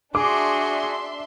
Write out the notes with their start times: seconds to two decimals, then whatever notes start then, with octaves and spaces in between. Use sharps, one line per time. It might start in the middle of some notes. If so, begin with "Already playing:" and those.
0.15 D4 F#4 G#4 E5 C6 D6